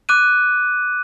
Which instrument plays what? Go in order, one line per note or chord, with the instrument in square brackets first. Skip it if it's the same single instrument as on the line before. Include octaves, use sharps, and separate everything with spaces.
[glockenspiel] D6 F#6 D#7